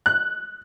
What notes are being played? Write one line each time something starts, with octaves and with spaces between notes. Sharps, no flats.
F#6